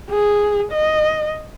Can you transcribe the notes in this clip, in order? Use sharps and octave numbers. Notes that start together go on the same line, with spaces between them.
G#4
D#5